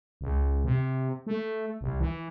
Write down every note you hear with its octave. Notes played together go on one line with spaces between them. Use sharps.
C#2
C3
A3
C2
E3